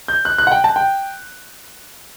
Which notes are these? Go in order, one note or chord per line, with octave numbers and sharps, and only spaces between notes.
G6
F#6
F#6
F#5
G5
A5
G5